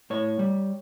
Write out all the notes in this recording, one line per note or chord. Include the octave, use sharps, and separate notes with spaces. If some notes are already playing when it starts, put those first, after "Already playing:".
A2 C#5
G3